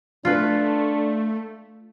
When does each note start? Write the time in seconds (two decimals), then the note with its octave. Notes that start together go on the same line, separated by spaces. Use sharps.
0.25 A3 D4 F4 B4